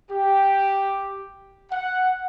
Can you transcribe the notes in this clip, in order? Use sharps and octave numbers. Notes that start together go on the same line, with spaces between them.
G4
F#5